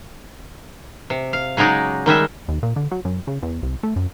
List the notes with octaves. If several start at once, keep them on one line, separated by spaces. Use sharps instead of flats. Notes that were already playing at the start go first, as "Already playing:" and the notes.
C3
F5
C#3 F#3 G#3 D#4 D5
D#3 G3 G#3 E5
D#2
A#2
D3
F#3
F#2
C#3
E2
C2
A3
F#2